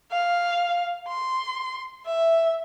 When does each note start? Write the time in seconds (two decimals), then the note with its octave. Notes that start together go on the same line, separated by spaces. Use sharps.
0.12 F5
1.08 C6
2.06 E5